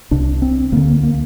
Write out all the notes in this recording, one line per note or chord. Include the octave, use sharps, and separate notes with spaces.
C2 C3 D4
C4
D2 D3 A#3
A#3
A#3